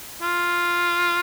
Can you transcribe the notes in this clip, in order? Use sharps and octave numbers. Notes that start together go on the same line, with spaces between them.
F4